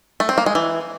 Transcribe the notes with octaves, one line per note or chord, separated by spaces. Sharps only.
A3
C4
A#3
G#3
E3